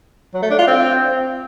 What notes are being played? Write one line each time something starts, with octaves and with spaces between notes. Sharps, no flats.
F#3
A3
D4
F4
C4